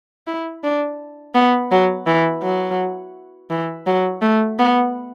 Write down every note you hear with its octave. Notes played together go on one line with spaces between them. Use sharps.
E4
D4
B3
F#3
E3
F#3
E3
F#3
A3
B3